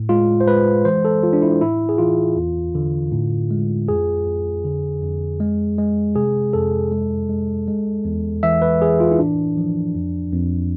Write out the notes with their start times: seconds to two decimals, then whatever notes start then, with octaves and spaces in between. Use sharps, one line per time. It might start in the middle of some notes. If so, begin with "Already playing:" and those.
Already playing: A2
0.09 G#3 F4
0.40 C5
0.47 G#3 B4
0.85 E3 C5
1.05 A4
1.23 E3 F4
1.33 D4
1.42 E4
1.61 A2 E4
1.89 G#4
1.98 E3 F4
2.37 E2
2.75 D3
3.12 A2
3.51 G#3
3.88 F2 G#4
4.26 F2
4.64 D3
5.02 F2
5.40 G#3
5.78 G#3
6.16 C3 G#4
6.53 F2 A4
6.91 G#3
7.29 G#3
7.68 G#3
8.05 E2
8.43 E3 E5
8.62 B4
8.81 E3 G#4
9.00 F4
9.12 E4
9.19 A2 D4
9.57 F3
9.95 F2
10.32 F2